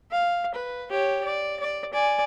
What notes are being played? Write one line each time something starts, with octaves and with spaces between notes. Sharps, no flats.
F5
B4
G4 C#5
D5
D5
D5 G#5